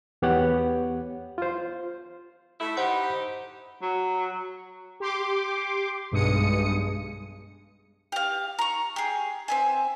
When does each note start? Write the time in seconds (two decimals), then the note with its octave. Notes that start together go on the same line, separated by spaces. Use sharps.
0.22 E2 B3 G4 C#5 F#5
1.38 F4 C5
2.60 A3 E4
2.77 D#4 G4 C5 F#5 B5
3.82 F#3
5.00 G4 C6 D6
6.11 B1 G2 G#3 D#6 C#7
8.12 G4 F5
8.59 A#5 C#6
8.96 G4 G#4
9.48 C4 E5 G#5